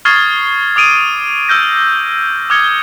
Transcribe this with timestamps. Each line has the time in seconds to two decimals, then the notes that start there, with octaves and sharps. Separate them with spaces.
0.05 C#6 D#6 F6 G#6 A6 C7
0.76 D6 D#6 D7 D#7
1.49 E6 F6 G6 A#6
2.50 D6 D#6 F6 G#6 C#7 G7